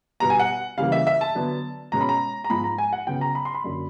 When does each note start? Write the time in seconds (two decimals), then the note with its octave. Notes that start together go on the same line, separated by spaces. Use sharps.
0.20 B2 G3 B3 A#5
0.30 G#5
0.40 F#5
0.78 C#3 E3 G3 A#3 F5
0.92 E5
1.07 E5
1.21 A5
1.35 D3 F#3 B3
1.92 B2 G#3 C#4 A#5
2.01 B5
2.09 A#5
2.44 A#5
2.50 G#2 F3 G#3 B5
2.64 A#5
2.78 G#5
2.93 F#5
3.07 C#3 F#3 B3 G5
3.21 A#5
3.35 B5
3.45 C6
3.55 B5
3.64 F#2 D3 F#3 A#3